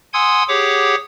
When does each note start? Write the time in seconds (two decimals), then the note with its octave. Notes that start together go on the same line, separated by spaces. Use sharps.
0.14 F#5 G#5 C6 D#6 E6 G#6
0.48 G4 G#4 C#5 F#5 D6